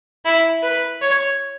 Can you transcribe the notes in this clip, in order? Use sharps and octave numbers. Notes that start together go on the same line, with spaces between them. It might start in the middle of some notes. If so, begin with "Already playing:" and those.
E4
B4
C#5